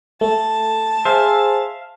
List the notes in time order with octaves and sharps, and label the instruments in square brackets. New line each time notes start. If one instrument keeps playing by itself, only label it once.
[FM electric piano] A3 [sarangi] A5
[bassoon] G#4 [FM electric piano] C5 [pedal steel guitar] E5 F5